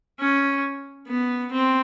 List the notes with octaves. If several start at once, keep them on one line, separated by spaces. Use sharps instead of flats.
C#4
B3
C4